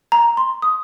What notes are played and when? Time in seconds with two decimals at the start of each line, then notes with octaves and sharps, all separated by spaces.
0.12 A#5
0.37 C6
0.62 D#6